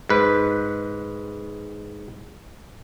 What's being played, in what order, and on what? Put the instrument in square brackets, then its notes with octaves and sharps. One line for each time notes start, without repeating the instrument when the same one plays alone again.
[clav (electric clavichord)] G#2 B4